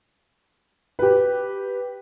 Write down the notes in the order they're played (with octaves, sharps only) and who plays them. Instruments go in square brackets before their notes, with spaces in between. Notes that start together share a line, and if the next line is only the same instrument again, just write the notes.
[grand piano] G4 B4